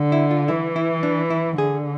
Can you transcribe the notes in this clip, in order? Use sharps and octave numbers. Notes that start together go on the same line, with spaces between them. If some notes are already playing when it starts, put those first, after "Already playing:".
Already playing: D3
E4
F4
E3 E4
E4
D4
E4
D3 G#4